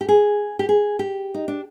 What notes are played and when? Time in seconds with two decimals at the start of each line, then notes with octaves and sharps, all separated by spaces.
0.01 G4
0.09 G#4
0.59 G4
0.69 G#4
0.99 G4
1.34 D#4
1.48 D4